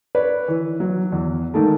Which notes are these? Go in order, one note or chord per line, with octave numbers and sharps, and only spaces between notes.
B4 C#5 D5
E3
F#3
E2
G#2 D#3 A3